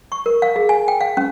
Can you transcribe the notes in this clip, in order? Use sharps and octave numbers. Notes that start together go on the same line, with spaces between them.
C#6
A#4
F5
G#4
G#5
G5
F5
C#4